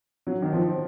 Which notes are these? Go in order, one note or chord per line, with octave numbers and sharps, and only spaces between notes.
F#3
D#3
F3